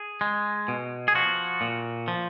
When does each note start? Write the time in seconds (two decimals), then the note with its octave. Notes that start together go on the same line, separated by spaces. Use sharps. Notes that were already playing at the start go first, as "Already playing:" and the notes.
Already playing: G#4
0.21 G#3
0.68 B2
1.08 G#4
1.15 F3 F#4
1.61 A#2
2.08 F3